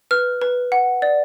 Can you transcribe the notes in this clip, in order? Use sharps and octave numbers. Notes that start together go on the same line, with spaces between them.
B4 F6
B4
F#5
D5